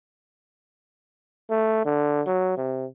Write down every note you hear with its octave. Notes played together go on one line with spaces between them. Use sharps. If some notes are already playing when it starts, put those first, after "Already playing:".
A3
D3
F#3
C3